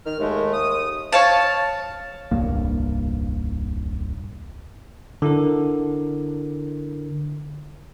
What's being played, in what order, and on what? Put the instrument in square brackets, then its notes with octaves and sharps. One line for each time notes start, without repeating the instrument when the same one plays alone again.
[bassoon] D#3 [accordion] F6
[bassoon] D#2 [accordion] G#3 A3
[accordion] D#6
[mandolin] C#5 F5 A5
[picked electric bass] D#1 C2 G2 A#3
[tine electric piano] D3 E4 A#4